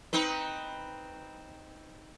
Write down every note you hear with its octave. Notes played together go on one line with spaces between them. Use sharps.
C4 D#4 B4